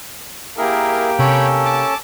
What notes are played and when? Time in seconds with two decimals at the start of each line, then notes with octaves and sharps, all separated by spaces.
0.57 A#3 E4 G4 G#4 A#4
1.19 C3 C#4 A4 C#5 G5 B5
1.65 A5 D6